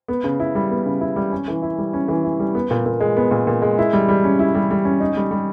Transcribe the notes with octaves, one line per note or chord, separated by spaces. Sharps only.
B3
C#3
E4
G3
B3
C#3
E4
G3
C#4
E3
E4
G3
C#4
E3
E4
G3
B3
A#2
A#2
G#3
B3
A#2
A#2
G#3
E4
G3
G3
C#4
E4
G3
G3
C#4
D#4
G3
G3